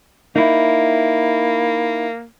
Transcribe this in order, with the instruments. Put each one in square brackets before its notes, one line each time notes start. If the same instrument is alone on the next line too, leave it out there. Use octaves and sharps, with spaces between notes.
[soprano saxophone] A#3 [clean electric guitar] D#4 E4